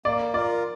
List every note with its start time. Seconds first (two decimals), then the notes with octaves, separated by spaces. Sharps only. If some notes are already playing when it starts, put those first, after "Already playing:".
0.05 A#3 D5
0.34 F4 A#4 D5